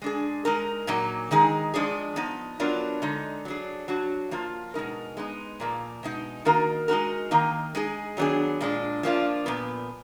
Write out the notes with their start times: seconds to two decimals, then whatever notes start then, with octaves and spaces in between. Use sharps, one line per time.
0.02 G#3 D4 G#4
0.45 G#3 D#4 A#4
0.87 A#2 F#3 A#3 D#4
1.31 D#3 G#3 D#4 G#4
1.74 F3 G#3 D4 G#4
2.16 F3 B3 D#4
2.60 F#3 B3 D4 F4 A#4
3.02 D3 G#3 D#4
3.45 F#3 D4 G#4
3.88 F#3 D4 F#4
4.31 F3 A#3 F4
4.74 B2 G#3 D#4 A#4
5.17 G#3 B3 D#4
5.60 A#2 F3 A#3
6.03 B2 G#3 D#4
6.45 D#3 A#3 D#4 F#4 A#4
6.88 G#3 D#4 F#4 A#4
7.31 D#3 A#3 D#4
7.75 G#3 D#4 G#4
8.17 D#3 F#3 B3 D4 G#4
8.61 A#2 G#3 D4
9.03 F3 A#3 D4 F4
9.46 A#2 F3 B3